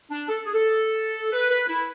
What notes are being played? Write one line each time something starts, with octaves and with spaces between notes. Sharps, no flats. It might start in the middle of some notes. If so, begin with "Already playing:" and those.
D4
A4
G#4
A4
B4
B4
E4